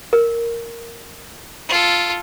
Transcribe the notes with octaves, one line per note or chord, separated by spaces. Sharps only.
A#4
F4 A4